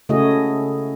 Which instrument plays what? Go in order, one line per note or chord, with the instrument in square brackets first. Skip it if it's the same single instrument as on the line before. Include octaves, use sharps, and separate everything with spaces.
[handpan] C#3 A3 E4 F#4 G#4 D#5